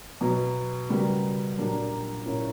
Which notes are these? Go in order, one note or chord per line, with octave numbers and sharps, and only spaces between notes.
B2 F#3 B3
C#3 G3 B3 F#4 A#4
A#2 F#3 A#3 D4 G4
A#2 A#3 C#4 E4